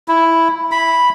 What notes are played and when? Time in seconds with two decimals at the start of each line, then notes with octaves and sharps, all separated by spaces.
0.08 E4
0.71 B5